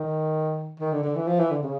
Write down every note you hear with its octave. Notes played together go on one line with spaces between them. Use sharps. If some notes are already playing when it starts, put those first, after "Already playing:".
Already playing: D#3
D#3
D3
D3
E3
F3
E3
D3
C#3